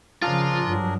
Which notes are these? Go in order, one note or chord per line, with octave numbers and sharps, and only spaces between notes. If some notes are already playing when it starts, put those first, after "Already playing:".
C#3 F3 D4 F4 G#4 A#4
G2 F#3